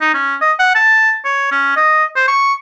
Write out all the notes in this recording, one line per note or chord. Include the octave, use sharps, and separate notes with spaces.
D#4
C#4
D#5
F#5
A5
C#5
C#4
D#5
C5
C#6